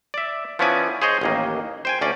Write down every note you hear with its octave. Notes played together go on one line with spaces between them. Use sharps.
D5 E5
F3 B3 C#4 E4 D5 G#5
G#4 C5 C#5 D#5
A1 D#2 A#3
C5 G5 G#5
D2 C#4 D5